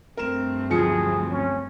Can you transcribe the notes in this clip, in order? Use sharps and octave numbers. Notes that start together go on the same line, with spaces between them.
G2 A3 C4 A#4 E7
D1 F3 G#4 C#7
C#4